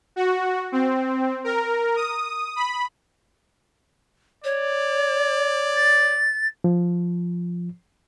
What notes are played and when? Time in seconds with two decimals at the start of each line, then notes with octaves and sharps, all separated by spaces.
0.16 F#4
0.72 C4
1.44 A#4
1.96 D#6
2.56 B5
4.44 C#5 D5
5.75 A6
6.64 F3